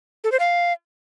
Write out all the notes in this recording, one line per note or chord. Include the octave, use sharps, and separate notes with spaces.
A4
C5
F5